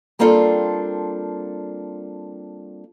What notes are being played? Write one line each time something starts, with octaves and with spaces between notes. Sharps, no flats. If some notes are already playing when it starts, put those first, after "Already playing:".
G3 A#3 C4 D4 F4 A4